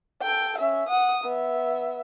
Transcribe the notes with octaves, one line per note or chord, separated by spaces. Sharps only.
A4 G5
C#4 E5
F#5 D#6
B3 E5